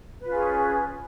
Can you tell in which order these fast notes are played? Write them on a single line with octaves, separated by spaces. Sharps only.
B4 F4 C#4 G#4